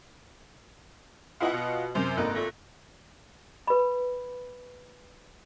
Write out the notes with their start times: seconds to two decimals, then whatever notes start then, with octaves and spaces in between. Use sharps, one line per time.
1.40 G#2 B3 E4 F4 D#5 F#5
1.53 B2
1.95 F#2 C3 A#4 C5
2.17 G#1 D2 A3 A#3 D#4 F#6
2.35 A#2 A3 A#6
3.67 B4 B5